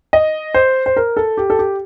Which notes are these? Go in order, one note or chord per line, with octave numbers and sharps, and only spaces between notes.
D#5
C5
C5
A#4
A4
G4
A4
G4